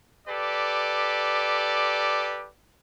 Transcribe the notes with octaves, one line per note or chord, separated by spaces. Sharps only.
G4 A4 B4 D5